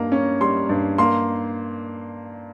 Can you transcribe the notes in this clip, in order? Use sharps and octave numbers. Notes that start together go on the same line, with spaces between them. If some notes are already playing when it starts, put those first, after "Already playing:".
Already playing: G2 G3 A#3 A#5
C#4
G3 C6
G2
A#3 C6